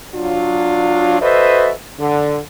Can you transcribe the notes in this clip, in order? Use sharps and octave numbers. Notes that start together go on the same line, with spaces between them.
F#3 D4 F4
F#4 A4 B4 C5 D#5 E5
D3